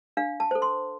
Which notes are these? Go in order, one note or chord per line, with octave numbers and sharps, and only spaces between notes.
D4 F5
A5
A4 C5
C6